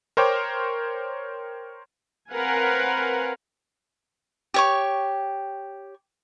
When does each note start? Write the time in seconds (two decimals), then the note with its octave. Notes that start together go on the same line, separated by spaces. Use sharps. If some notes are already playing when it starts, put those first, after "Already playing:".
0.17 A#4 C5 C#5 G5 D6
2.31 C4 A#4 B4 F5 F#5 G#5
4.54 G4 C#5 C#6